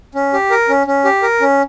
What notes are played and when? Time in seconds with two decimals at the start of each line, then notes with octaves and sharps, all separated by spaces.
0.15 C#4
0.33 G4
0.50 A#4
0.69 C#4
0.87 C#4
1.05 G4
1.22 A#4
1.41 C#4